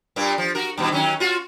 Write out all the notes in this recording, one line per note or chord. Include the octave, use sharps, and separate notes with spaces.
G2 A#2 A#3
F3
F#4 A#4
G2 B2 E3
D#3 F#3 C#4
F4 F#4